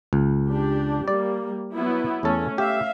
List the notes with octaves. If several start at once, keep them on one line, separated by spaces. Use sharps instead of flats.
C#2
D4 G4
G3 A#3 D5
F#3 B3 E4
E2 A3 C#4 A4
G4 E5 F5